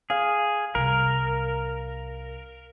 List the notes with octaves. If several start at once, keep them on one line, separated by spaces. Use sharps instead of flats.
G#4 F5
C2 A#4